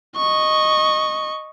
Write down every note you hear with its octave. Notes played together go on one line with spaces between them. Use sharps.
D#5 C#6